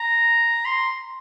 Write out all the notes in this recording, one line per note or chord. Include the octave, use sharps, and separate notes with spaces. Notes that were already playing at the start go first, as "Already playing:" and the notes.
Already playing: A#5
C6